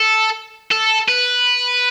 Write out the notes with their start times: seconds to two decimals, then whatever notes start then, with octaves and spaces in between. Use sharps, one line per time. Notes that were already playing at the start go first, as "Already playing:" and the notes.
Already playing: A4
0.71 A4
1.09 B4